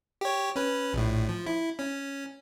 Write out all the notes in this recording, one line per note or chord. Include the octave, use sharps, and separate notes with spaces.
G4 C#5
C#4 B4
A#1 A2
F3
E4
C#4